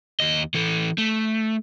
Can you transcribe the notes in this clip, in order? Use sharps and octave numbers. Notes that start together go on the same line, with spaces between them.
D#2 D#5
E3 A4
A3